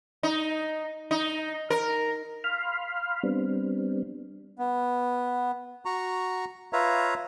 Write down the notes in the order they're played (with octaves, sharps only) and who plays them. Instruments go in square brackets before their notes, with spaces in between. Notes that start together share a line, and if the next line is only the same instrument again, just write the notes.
[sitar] D#4
D#4
A#4
[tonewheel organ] F5 B5 C6 F6
G3 B3 C4 D4
[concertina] B3
F#4 A#5 C#6
F4 B4 C#5 E5 F5 A#5